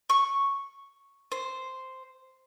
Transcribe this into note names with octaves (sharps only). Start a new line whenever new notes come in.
C#6
C5